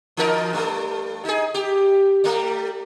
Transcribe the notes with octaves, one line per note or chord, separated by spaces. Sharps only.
E3 D#4 A#4
G2 A3
D#4 G#4
G4
G3 A3